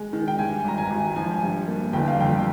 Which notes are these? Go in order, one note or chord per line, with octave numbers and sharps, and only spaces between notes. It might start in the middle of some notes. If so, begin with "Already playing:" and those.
Already playing: G#3
D#3
G5
G2 G#5
G#1 A#5
G#5
G#1
F3 G#5
G2
A#3
G1 G5
F5
F2 G5